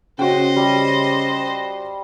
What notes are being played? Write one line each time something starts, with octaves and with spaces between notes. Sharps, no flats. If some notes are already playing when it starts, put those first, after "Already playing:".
C#3 F#4 C5 D#5 G5
G3